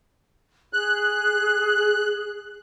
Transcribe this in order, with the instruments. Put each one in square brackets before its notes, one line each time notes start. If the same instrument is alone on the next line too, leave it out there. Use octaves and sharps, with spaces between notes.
[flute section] G#4 [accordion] F#6